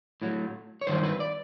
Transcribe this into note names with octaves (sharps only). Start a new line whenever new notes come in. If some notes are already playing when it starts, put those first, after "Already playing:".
A2 F#3
C#5
G2 D#3 F#3 C5
B4
D5